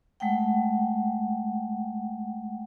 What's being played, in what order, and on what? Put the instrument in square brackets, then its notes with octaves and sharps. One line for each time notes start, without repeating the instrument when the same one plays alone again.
[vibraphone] G#3 A3 F#5 G5